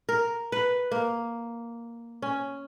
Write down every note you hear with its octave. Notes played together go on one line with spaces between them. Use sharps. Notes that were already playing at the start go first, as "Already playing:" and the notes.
A#4
B4
A#3
C#4